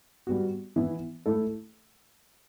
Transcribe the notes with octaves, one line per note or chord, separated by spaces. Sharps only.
G3 B3 F#4
E3 B3 E4
A3 E4 A4